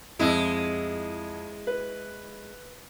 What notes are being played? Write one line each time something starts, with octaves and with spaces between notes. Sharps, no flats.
F2 G#3 E4
B4